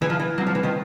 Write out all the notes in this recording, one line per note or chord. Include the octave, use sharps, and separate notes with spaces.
D#3 E3
F3
E3
F#3 G3 C4
F3
E3
D#3 F3